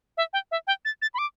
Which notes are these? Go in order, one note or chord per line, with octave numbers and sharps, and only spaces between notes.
E5
G5
E5
G5
A6
A6
B5
D6